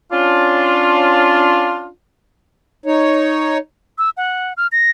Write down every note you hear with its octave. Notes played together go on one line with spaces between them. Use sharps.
C#4 D4 F4
D#4 C#5
E6
F#5
F6
A#6